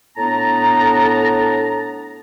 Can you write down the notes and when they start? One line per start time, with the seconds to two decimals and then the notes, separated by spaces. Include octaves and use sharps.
0.17 A2 B3 D4 A5 A#5